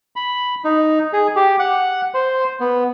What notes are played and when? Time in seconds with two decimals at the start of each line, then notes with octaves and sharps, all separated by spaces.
0.16 B5
0.64 D#4
1.13 G#4
1.36 G4
1.59 F#5
2.14 C5
2.60 B3